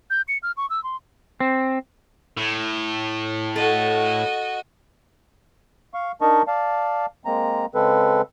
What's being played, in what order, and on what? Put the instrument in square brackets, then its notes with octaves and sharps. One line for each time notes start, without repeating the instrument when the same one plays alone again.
[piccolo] G6
C#7
F6
C#6
E6
C6
[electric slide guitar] C4
[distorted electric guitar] A2
[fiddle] F#4 D#5 [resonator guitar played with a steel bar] A4
[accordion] F5 C#6
D4 D#4 A#4 D#5 A5 C#6
D5 F5 A5
G#3 A#3 C4 A#5
C#3 G#3 C4 A4 B4